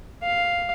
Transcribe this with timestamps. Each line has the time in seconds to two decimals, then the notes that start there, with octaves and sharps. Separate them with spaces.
0.23 F5